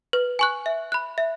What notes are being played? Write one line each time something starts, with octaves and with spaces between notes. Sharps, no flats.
B4
G#5 C#6 F#6
E5
B5 F#6
E5